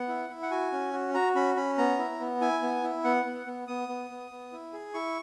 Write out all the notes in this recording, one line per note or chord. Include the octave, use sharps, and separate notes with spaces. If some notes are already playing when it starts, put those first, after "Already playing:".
Already playing: B3 F#5
E4
E4
F#5
F#4 G#5
C#4
F#4
F#4 A#5
C#4 B5
C#4 B5
B3 A#5
E4
B3
E4 G#5
B3
E4
B3 F#5
B3
B3
B3 D#6
B3
B3
B3
E4
G#4
E4 C#6